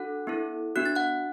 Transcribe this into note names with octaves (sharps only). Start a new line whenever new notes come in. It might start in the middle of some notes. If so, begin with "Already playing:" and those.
Already playing: D4 F#4 A4 F#5 F#6
B3 E4 A4
B3 D4 F#4 F#6
A6
F#5 F#6